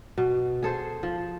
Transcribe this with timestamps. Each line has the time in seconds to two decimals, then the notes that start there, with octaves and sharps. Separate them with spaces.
0.18 B2
0.62 G#4 A4 C5
1.03 F3